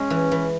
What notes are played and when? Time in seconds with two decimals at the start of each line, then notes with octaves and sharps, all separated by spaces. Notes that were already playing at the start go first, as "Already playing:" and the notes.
Already playing: G#3 C#4
0.10 E3
0.32 E3